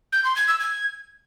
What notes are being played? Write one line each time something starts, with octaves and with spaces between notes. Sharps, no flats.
G6
C6
G#6
E6
G#6